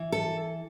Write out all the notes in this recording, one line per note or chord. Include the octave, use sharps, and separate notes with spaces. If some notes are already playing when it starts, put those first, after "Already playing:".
Already playing: E3
A4